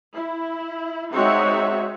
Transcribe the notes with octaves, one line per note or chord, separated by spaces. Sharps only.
E4
G#3 C4 D#4 F#4 C#5 E5